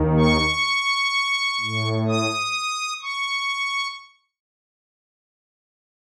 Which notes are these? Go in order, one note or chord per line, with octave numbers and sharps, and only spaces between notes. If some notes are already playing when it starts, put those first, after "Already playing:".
Already playing: D#2 D#3
C#6
A2
D#6
C#6